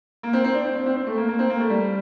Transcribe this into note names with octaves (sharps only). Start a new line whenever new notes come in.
A#3
C4
C4
D4
C4
C4
C4
C4
A3
A#3
A#3
C4
A#3
A3
G3